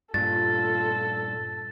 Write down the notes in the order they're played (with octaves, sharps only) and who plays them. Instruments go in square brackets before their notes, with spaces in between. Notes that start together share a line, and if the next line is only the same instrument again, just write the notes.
[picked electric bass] G2 A#2 [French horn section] F4 [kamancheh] A4 [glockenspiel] A6